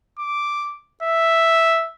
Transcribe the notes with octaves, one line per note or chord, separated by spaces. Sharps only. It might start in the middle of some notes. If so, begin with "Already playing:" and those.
D6
E5